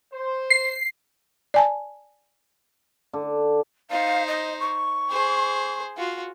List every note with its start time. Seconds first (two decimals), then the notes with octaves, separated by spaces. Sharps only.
0.13 C5
0.50 C7
1.54 D5 G#5 A5
3.13 D3
3.90 D#4 C5 F5
4.27 D#5
4.60 C#6
5.10 G#4 C5
5.97 F4 F#4